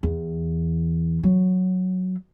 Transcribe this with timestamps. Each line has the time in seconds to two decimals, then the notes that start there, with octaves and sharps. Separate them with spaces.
0.03 E2
1.23 F#3